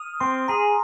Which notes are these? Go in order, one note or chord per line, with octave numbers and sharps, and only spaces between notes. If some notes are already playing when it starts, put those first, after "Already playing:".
Already playing: D#6 F6
C4 C6
G#4 A#5